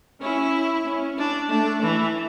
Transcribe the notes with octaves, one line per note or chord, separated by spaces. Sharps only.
C#4 E4
C#4
D4
A3 D4
E3